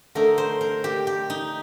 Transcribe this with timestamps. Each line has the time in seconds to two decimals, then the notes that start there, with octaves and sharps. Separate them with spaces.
0.15 D3 A3 D#4 A#4
0.38 C5
0.61 A#4
0.84 G4
1.07 G4
1.30 D#4